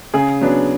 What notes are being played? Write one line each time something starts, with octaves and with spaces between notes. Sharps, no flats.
C#3 G#4
F#3 B3 D4